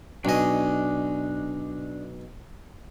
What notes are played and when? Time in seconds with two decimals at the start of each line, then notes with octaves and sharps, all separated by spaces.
0.25 B1 D4 D#5 G#5